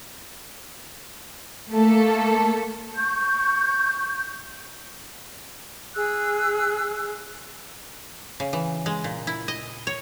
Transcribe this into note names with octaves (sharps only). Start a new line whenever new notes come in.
A3 A#3 A4
C#6 G6
G#4 E6 F#6
C#3
E3
G#3
A#2
E4
D#5
C#5